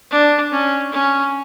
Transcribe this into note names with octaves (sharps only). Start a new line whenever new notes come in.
D4
C#4
C#4